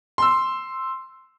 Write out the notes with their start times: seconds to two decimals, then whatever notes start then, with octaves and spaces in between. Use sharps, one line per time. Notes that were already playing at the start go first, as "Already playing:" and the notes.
0.18 C6 E6